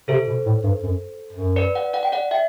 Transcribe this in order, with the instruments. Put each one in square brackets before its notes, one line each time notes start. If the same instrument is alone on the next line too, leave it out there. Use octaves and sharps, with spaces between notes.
[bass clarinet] C3 [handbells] A4 C5
[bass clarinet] B2
A2
G2
F#2
F#2
[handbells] B4 D5
D5 F#5
D5 F#5
G5
D5 F#5
E5 G5